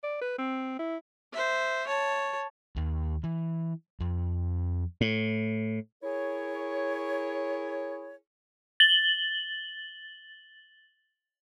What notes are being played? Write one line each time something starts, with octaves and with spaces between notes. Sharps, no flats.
D5
B4
C4
E4
C5 E5
C#5 A5
D#2
E3
F2
A2
E4 G#4 A#4 C#5
A6 F#7 G7